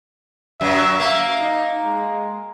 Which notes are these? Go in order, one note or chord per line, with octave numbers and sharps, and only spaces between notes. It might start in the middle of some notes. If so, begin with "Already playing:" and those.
F#2 F#3 E5
A#3
D#4
G#3